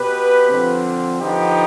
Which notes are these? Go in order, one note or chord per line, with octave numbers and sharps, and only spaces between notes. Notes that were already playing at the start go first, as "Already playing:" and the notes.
Already playing: B2 B3 G4 B4
D3 F3 C4
D3 F3 B3 D#4 G4